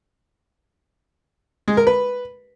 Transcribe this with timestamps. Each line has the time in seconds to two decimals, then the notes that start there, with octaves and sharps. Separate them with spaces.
1.68 G#3
1.77 A#4
1.87 B4